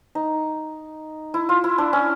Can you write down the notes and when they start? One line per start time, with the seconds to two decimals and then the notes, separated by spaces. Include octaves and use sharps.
0.15 D#4
1.34 E4
1.49 F4
1.64 E4
1.78 D4
1.93 C#4